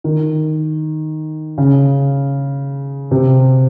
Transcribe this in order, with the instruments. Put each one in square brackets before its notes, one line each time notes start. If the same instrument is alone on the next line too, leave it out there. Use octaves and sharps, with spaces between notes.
[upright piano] D#3
C#3
C3